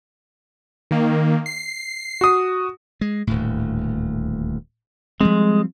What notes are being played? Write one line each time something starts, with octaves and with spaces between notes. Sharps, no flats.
D#3 A#3
C7
F#4 D#6
G#3
D#1 D2 A2
F3 G3 G#3 C4